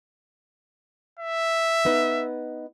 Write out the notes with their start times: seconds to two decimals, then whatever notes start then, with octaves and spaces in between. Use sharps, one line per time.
1.20 E5
1.85 B3 D#4 B4